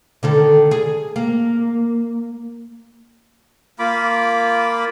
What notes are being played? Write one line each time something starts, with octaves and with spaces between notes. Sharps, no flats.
D3 D#3 A4
G#4
A#3
A#3 F4 B5 D6